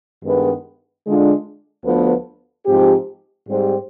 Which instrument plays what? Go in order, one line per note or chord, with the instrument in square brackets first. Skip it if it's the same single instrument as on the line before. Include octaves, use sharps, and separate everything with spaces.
[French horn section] G2 D#3 G#3 B3
D3 G#3 D4 F4
D2 D3 F3 B3
G#2 F3 C4 G4
G#2 G3 C4 G4